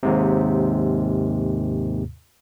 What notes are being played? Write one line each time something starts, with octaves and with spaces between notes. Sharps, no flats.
D#2 G#2 C3